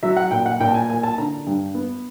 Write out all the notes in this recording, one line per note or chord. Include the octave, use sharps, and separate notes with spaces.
F#3 E5
F#5
A#2 G5
F#5
A#2 G5
A5
G#5
A#3 G#5
A5
D3 A#5
G2
B3